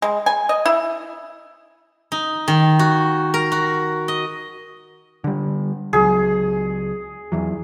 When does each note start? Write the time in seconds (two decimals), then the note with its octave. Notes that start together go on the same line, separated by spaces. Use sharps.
0.02 G#3
0.26 G#5
0.49 D#5
0.65 E4
2.12 D#4
2.48 D#3
2.79 F#4
3.34 A#4
3.52 F#4
4.08 D#5
5.24 D3 G3
5.93 C#2 F#3 G#4
7.32 E2 E3 F#3